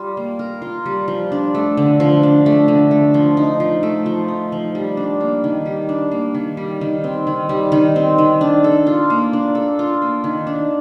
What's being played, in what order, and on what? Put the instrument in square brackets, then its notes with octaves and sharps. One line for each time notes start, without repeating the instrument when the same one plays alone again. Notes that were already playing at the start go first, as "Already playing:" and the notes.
Already playing: [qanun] G3 F4
A#3
A#4
F4
G3
F3
D4
A3
D3
F3
D4
A3
D3
A3
F3
D#4
F3
A3
F3
D#4
F3
G3
D4
A#3
D#3
G3
D4
A#3
D#3
G3
D#3
C4
D#3
G3
D#3
C4
D#3
D4
A4
F4
A#3
D4
A4
F4
A#3
D#3
D4